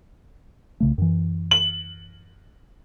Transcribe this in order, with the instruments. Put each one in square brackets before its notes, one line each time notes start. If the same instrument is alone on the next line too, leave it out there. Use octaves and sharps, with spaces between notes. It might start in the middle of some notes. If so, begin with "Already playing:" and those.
[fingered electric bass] C2 C#3 A3
F#2 E3
[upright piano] F#7